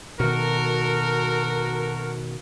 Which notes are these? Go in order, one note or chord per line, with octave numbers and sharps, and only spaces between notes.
B2 D#3 F#4 A4 A#4